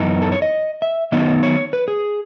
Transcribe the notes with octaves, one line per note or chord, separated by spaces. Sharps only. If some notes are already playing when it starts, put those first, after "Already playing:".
Already playing: F#2 E3 B3 D#4
A4
C#5
D#5
E5
D#3 F#3 B3 D#4 D#5
C#5
B4
G#4